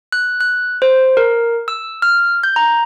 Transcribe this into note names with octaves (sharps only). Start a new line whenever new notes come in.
F#6
F#6
C5
A#4
E6
F6
G6
A#5